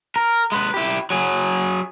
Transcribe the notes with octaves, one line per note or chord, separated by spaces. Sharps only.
A#4
G#3 B4
E4 G4
F#3 G#4